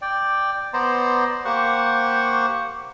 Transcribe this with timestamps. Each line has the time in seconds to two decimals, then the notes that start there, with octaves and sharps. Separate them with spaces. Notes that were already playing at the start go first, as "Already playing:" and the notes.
0.02 D5 G5
0.74 B3 C5 D5 A#5 C6
1.45 A#3 G4 C5 F#5 C#6